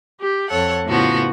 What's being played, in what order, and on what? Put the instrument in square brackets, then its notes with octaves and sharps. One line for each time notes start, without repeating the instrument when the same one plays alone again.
[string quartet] G4
F2 A4 C#5 F#5
A2 C#3 F3 B3 F#4